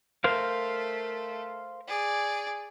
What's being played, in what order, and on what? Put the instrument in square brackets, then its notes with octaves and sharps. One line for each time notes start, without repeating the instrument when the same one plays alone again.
[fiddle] A3 [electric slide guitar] A#4 C5 F5
[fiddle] G#4 D5